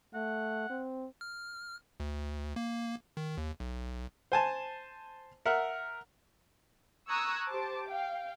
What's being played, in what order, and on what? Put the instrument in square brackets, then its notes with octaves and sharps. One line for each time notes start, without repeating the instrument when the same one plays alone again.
[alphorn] A3 [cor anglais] F#5
[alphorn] C4
[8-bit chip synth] F6
D2
A#3
D#3
D#2
B1
[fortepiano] C5 G#5 A5
A#4 E5 F#5
[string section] A#5 C#6 D#6 E6 F#6 G#6
G4 C5 A5 D6
F5 G5